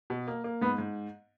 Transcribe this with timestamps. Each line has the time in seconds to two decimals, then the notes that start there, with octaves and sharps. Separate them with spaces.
0.10 B2
0.28 A#3
0.44 A#3
0.62 G#2 B3
0.78 G#2